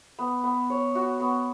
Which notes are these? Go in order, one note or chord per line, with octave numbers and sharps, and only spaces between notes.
B3
B3
C#5
F#4
B3